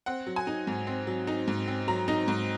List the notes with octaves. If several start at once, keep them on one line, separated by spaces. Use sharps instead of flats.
C4 F#5
F#3
G#5
D#4
G#2
C4
F#3
D#4
G#2
C4
F#3 A#5
D#4
G#2